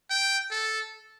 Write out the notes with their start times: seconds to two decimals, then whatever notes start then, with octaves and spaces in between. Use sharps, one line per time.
0.10 G5
0.51 A4